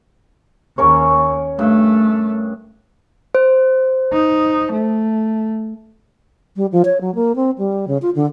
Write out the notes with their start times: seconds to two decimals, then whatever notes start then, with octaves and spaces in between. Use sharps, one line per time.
0.78 D#2 C#4 A#4 C#5
1.59 G2 A3
3.35 C5
4.13 D#4
4.72 A3
6.56 G3
6.72 F3
6.85 C#5
7.01 F#3
7.15 A#3
7.36 C4
7.58 G3
7.88 C#3
8.02 F4
8.15 D3